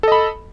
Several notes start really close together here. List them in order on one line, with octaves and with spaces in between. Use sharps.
A4 D#5 B5